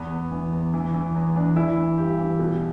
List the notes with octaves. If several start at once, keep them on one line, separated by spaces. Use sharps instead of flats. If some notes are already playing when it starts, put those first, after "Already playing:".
Already playing: E2 B3
E2
E3
E2
E3
E3
E2 B3
E3 D4
E3 E4
E3
G2 G4
E3
B2